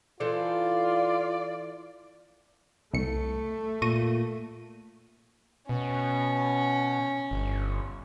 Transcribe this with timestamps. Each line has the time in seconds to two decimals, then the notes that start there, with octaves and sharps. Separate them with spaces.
0.20 E3 F4 A4 C5 D5
2.93 C2 A3 C#7
3.82 A#2 C#6 A#6 D#7
5.69 B2 C#4
7.31 G1